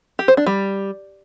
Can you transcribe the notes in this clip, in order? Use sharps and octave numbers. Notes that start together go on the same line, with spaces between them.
G4
C5
D4
G3